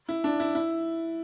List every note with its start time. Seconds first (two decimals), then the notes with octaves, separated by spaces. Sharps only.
0.09 E4
0.24 D4
0.40 E4
0.55 E4